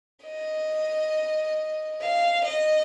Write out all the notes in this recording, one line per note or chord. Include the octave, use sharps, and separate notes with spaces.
D#5
F5
D#5